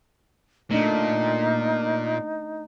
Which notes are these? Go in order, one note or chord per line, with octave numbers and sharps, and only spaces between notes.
A#2 A3 D4 D#4